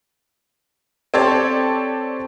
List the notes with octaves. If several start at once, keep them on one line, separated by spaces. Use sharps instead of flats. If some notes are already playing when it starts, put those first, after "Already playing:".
C4 G4 A4 C#5 D5